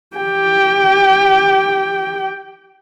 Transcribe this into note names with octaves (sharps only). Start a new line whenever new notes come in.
G4 G5